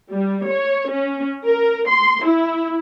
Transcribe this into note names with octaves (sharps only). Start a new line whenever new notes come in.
G3
C#5
C#4
A#4
C6
E4